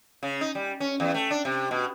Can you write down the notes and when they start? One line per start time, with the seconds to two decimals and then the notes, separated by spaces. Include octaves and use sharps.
0.23 C#3
0.41 D#4
0.55 G3
0.80 C#4
1.00 E2
1.14 A3
1.31 D4
1.45 C3
1.71 B2